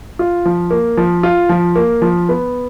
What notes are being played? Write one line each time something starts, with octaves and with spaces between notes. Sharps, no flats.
F4
F3
A#3
F3
F4
F3
A#3
F3
B3